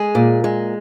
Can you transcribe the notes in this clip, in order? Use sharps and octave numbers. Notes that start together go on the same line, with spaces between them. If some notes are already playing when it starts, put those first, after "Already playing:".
Already playing: G#3 G#4
A#2
G#3